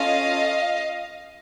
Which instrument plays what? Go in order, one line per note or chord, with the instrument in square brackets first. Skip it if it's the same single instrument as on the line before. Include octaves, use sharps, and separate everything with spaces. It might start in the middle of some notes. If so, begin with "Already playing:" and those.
Already playing: [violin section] C#4 F4 A4 D#5 F5